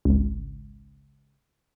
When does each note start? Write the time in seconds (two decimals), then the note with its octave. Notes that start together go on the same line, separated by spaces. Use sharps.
0.05 G#1 C#2